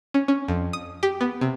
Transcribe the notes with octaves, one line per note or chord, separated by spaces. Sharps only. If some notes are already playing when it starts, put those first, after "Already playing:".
C#4
C#4
F2
D#6
G4
B3
C3